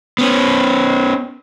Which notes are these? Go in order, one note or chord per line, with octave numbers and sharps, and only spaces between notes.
B3 C#4